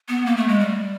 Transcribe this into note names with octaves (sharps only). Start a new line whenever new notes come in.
B3
A#3
A3
G#3
G3